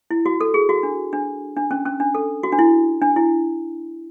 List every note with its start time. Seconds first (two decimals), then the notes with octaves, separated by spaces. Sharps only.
0.11 E4
0.26 F#4
0.41 A4
0.54 G#4
0.69 F#4
0.83 D4
1.13 D4
1.57 D4
1.71 C#4
1.86 C#4
2.00 D4
2.15 A4
2.43 F#4
2.52 D4
2.59 E4
3.02 D4
3.16 E4